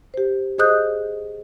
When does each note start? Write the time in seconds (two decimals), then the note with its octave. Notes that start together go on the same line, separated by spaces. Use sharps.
0.14 G4 C5
0.58 G#4 C5 D#5 D#6 F#6 G6